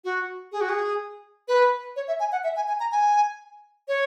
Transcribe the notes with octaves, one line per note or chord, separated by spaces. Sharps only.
F#4
G#4
F#4
G#4
B4
C#5
E5
G#5
F#5
E5
G#5
G#5
A#5
G#5
C#5